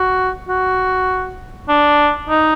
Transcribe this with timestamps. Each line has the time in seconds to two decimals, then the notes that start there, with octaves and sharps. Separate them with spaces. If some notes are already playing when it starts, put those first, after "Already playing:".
Already playing: F#4
0.49 F#4
1.69 D4
2.29 D#4